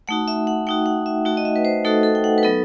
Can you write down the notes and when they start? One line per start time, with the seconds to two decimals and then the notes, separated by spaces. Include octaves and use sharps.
0.08 A3 D#4 F#4 F#5
0.28 E5
0.47 F#5
0.67 A3 D#4 F#4 G5
0.86 F#5
1.06 E5
1.25 A3 D#4 F#4
1.37 D#5
1.45 E5
1.56 B4
1.65 C5
1.85 A3 D#4 F#4 A4
2.03 A4
2.15 G5
2.24 F#5
2.38 B4
2.43 F#3 B3 D#4 A4